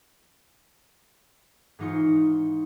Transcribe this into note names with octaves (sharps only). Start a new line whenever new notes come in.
G#2 E3 D#4 F4 C5 C#6